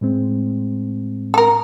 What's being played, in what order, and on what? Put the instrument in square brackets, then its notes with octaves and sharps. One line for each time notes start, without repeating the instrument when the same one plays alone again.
[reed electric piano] A2 G#3 C4
[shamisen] A4 A#4